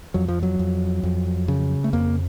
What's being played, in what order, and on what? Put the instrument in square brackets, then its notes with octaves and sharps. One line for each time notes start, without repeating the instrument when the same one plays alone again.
[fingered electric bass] F2 F#3
F3
F#3
F2
F2
C#3
A3
F2 A#3